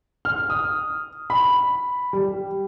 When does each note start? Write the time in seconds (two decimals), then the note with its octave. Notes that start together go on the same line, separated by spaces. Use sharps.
0.25 F6
0.50 D#6
1.30 B5
2.13 G3